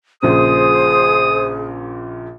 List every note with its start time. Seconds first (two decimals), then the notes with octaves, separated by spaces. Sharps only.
0.23 A#1 A#2 C#3 G#4 C5 D#6